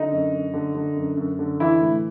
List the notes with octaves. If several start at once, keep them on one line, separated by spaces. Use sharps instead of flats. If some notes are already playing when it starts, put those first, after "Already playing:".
Already playing: D3 D#4
F#2
F#2
D3
D3
F#2
F#2
D3
E3 E4
A2